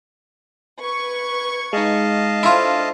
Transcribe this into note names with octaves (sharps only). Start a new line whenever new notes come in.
B4 C#6 G#6
G#3 D#4 D#5 F5 A5
D4 E4 F4 A4 C5